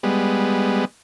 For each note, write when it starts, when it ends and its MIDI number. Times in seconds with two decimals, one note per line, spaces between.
0.03 0.85 55
0.03 0.85 56
0.03 0.85 59